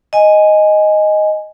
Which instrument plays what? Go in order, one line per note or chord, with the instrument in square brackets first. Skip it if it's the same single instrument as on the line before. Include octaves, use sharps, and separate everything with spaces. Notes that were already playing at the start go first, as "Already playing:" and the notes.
[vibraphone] D#5 G#5